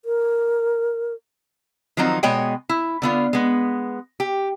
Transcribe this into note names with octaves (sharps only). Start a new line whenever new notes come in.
A#4
D#3 F3 F#3 C4 D#4
B2 G#3 B3 C#5 D#5 G5
E4
D3 B3 F4
G#3 B3
G4